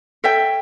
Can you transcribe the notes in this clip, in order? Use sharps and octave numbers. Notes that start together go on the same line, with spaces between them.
A4 C#5 E5 G5